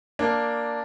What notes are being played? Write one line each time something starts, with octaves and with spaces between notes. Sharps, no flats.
A#3 D4